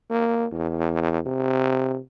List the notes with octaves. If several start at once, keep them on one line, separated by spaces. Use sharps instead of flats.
A#3
E2
C3